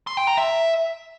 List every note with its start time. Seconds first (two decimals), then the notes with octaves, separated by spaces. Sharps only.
0.07 C6
0.17 G5
0.27 A#5
0.37 E5